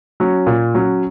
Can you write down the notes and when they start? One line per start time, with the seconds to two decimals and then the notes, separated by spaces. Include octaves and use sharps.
0.20 F#3 C#4
0.46 A#2
0.75 F#3 C#4